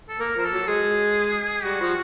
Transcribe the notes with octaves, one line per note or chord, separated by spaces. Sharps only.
A4
A#3 A#4
F3 A#4
A4
F#3
G#3 G#4
G3 F#4
F3